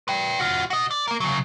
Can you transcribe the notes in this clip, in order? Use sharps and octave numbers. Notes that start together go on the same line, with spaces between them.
B4 G5
F4 F#4
F#4 D#5
D5
A#3 A#4
C#3 F#3